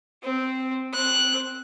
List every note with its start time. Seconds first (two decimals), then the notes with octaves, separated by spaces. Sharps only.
0.23 C4
0.93 C4 F#6